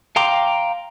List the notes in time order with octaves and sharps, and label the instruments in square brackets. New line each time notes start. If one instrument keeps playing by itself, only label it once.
[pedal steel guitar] F5 G5 A#5 C6 D6